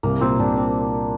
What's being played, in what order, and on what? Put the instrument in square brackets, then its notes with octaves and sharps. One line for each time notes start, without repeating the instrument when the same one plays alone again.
[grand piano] C2 [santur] A#3
[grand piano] A#2 [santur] C4
[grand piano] C2 [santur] D4
[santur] C4